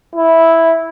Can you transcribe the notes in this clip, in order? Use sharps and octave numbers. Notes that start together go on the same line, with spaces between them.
E4